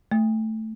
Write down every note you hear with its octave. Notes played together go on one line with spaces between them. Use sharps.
A3